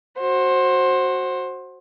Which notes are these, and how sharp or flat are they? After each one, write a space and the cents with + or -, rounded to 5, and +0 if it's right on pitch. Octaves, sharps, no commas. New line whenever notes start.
F#4 +0 C5 +20